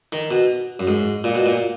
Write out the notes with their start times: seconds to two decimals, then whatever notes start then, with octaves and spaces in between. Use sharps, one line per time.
0.12 D#3
0.31 B2
0.80 F#2
0.87 G#2
1.24 A#2
1.35 B2
1.46 A#2